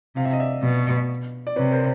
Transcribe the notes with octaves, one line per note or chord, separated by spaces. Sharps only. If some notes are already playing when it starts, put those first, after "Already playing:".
C3 F5
E5
D#5
D5 E5
B2
D5
C3 B4 C#5
A#4 C5